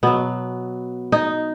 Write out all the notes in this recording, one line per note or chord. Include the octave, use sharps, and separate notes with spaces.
B2 F#3 B3
D#4